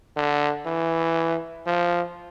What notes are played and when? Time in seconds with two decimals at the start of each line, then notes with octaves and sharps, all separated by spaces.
0.16 D3
0.66 E3
1.66 F3